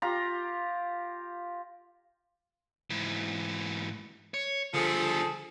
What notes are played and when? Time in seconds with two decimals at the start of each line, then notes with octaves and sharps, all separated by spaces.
0.02 F4 G4 A#5
2.90 G#2 E3
4.34 C#5
4.74 D3 F3 G3 G#4 A4